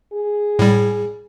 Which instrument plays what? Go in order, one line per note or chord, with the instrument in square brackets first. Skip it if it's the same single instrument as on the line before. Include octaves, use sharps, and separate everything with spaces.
[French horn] G#4
[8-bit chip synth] A2 G3